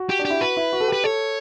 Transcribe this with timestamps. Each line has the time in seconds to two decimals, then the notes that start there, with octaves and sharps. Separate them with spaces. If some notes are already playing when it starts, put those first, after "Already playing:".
Already playing: F#4
0.10 G4
0.19 D4
0.25 G4
0.30 E4
0.40 F#4 B4
0.57 E4
0.72 F#4
0.80 A4
0.88 G4 B4
1.04 A4 C#5